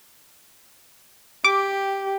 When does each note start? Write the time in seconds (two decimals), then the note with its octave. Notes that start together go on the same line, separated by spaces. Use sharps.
1.44 G4 D6